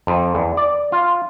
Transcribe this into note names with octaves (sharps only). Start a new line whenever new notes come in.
F2
E2
D5
F4